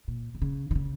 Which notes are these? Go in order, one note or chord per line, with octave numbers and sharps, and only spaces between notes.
A#2
C3
C#3
D#3
C#3